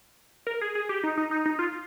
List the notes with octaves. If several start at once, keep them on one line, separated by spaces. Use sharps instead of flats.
A#4
G#4
G#4
G4
D#4
D#4
D#4
D#4
F4